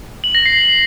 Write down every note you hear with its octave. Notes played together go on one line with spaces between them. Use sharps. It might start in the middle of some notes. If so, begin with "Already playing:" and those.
F#7
A#6
C7